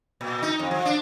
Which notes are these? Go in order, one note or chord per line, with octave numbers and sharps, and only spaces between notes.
A#2
D#4
F2
F3
D4